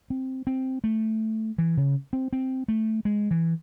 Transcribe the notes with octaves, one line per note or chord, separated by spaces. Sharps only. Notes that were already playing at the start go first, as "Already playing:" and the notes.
C4
C4
A3
E3
C#3
C4
C4
A3
G#3
E3